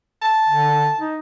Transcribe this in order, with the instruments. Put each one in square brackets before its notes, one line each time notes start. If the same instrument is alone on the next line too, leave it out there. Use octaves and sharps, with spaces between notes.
[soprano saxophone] A5
[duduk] D3
D#4